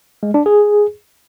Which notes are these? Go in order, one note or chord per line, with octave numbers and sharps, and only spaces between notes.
G#3
D4
G#4